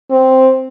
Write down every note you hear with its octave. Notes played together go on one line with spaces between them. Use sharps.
C4